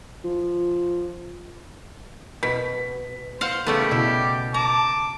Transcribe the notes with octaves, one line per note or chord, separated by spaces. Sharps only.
F3
B2 B6
C5 F5 F#5
C#3 G3 A3 B3 G4
B2 E4
A5 A#5 D6